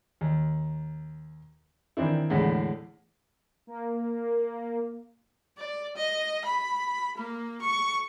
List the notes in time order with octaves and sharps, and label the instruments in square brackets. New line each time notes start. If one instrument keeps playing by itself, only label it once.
[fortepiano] D#2
D#3 E3 C4 D4 E4
E2 A2 D3 G#3
[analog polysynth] A#3
[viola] D5
D#5
B5
A#3
C#6